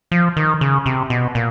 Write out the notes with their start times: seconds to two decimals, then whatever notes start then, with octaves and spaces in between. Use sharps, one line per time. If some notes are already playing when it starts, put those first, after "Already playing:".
0.11 F3
0.36 D#3
0.61 C#3
0.86 C3
1.10 B2
1.35 A#2